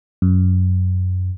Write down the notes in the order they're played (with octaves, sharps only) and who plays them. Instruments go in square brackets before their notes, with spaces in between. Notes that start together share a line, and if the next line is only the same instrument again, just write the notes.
[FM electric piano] F#2